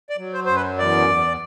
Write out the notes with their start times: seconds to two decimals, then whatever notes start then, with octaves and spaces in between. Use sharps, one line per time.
0.10 D5
0.18 F#3
0.33 C5
0.45 F#2 C5
0.55 B4
0.78 E2 D5
1.09 E2